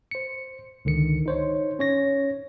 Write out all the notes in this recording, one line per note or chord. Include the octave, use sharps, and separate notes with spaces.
C5 C#7
C#2 D3 D#3 C#7
D#4 C5 C#5
C#4 C#5 A#6